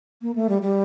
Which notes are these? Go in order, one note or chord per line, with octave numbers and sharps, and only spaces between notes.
A#3
A3
G3
G3